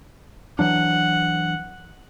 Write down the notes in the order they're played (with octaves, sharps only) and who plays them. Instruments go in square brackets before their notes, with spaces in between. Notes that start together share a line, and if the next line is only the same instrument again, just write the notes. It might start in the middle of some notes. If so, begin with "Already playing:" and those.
[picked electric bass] E3 F#3 D4 [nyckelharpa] F#5